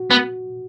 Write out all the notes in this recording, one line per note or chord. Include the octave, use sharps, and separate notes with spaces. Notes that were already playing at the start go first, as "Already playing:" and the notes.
Already playing: F#4
B3